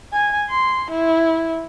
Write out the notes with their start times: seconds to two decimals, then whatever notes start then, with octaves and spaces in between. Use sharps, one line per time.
0.13 G#5
0.49 C6
0.91 E4